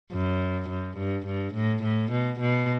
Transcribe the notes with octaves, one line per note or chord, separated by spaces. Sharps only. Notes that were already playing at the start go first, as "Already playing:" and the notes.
F#2
F#2
G2
G2
A2
A2
B2
B2